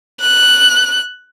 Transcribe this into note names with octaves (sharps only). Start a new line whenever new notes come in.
F#6